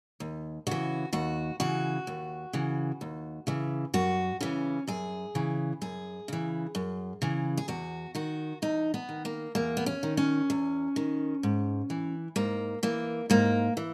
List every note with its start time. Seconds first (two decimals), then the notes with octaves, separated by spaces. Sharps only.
0.20 D#2
0.67 C#3 E3 F#4
1.13 D#2 F#4
1.60 C#3 E3 F#4
2.07 D#2
2.53 C#3 E3
3.01 D#2
3.47 C#3 E3
3.94 F#2 F#4
4.41 C#3 E3 C#4
4.87 F#2 G#4
5.35 C#3 E3
5.81 F#2 G#4
6.28 C#3 E3
6.75 F#2
7.22 C#3 E3
7.57 G#4
7.68 E2 F#4
8.15 D#3 F#4
8.62 E2 D#4
8.94 B3
9.09 D#3
9.25 A#3
9.55 E2 A#3
9.77 B3
9.86 C#4
10.03 D#3
10.17 C#4
10.50 E2
10.96 D#3
11.43 G#2
11.90 E3
12.36 G#2 A#3
12.83 E3 A#3
13.30 G#2 A#3
13.77 E3